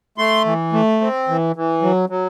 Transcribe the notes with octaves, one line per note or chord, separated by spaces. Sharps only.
A3 C6
E3
A3
C4
E3
E3
F#3
F#3